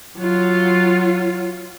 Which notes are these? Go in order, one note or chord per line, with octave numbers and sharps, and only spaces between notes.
F#3 F4